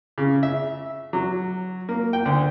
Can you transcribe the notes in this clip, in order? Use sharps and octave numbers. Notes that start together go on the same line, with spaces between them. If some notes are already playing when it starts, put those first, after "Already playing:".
C#3
E5
F#3
A#3
G5
D2